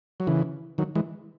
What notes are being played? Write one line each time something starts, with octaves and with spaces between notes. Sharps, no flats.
F#3
C#3 E3
D#3 F#3
E3 G#3